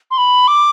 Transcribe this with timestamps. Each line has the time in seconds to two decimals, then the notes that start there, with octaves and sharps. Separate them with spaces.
0.11 C6
0.18 B5
0.48 D6